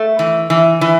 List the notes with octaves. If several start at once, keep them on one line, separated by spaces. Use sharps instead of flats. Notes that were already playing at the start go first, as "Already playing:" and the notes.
Already playing: A3
E3
E3
E3